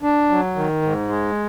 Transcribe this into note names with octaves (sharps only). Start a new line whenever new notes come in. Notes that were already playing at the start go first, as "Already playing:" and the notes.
D4
F#3
D#3
G#2
G#3